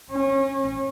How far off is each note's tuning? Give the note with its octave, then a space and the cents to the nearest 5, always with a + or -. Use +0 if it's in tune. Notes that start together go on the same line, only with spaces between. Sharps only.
C#4 -30